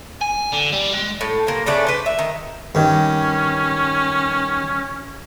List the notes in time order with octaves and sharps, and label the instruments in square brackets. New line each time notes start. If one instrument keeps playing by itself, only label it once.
[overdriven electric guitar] G#5
D3
G3
G#3
[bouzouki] A2
C3 A#3
C#3 A3 D4 D5
B4 C5
E5
D#3
[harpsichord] G2 D#3 [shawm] C#4